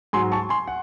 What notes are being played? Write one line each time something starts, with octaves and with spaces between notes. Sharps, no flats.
G#2 F#3 G#5 C6
A5 C#6
G#5 C6
F#5